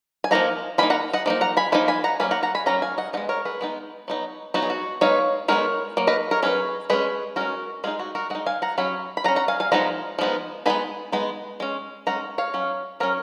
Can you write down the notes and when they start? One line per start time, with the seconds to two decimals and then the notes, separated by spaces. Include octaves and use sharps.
0.24 G#5
0.31 F3 A#3 D#4 F#5 A#5
0.78 F3 A#3 D#4 G#5 B5
0.90 F#5 A#5
1.13 D#5 F#5
1.26 F3 A#3 D#4
1.41 F#5 A#5
1.57 G#5 B5
1.72 F3 A#3 D#4 G#5 B5
1.88 G#5 B5
2.04 F#5 A#5
2.20 F#3 A#3 C#4 G#5 B5
2.31 F#5 A#5
2.43 F#5 A#5
2.55 G#5 B5
2.66 F#3 A#3 C#4 F#5 A#5
2.82 F5 G#5
2.98 D#5 F#5
3.13 G#3 B3 D#4 D#5 F#5
3.29 A#4 C#5
3.45 G#4 B4
3.61 G#3 B3 D#4
4.08 F#3 B3 D#4
4.54 F#3 B3 D#4 F#4
4.62 G#4
4.70 F#4
5.01 G#3 B3 D#4 C#5 F5
5.48 G#3 B3 D#4 A#4 C#5
5.97 F#3 A#3
6.07 B4 D#5
6.31 A#4 C#5
6.42 F#3 A#3 C#4 G#4 B4
6.90 G#3 C#4 G#4 B4
7.36 G#3 C#4 F#4 A#4
7.84 G#3 D#4 F4 G#4
7.99 F#4
8.15 F#4 A#4
8.30 G#3 D#4 D#5 F#5
8.46 F5 G#5
8.62 F#5 A#5
8.78 F#3 C#4 G#5 B5
9.17 B5
9.24 F#3 F#5 A#5
9.28 C#4
9.36 F#5 A#5
9.48 F5 G#5
9.60 F5 G#5
9.72 F3 G#3 B3 D#4 F#5 A#5
10.19 F3 G#3 B3 D#4
10.66 G#3 B3 D#4 G#5 B5
11.12 G#3 B3 D#4
11.60 G#3 C#4
12.07 G#3 C#4 F#5 A#5
12.38 C#5 F5
12.54 F#3 C#4
13.00 F#3 C#4 A#4 C#5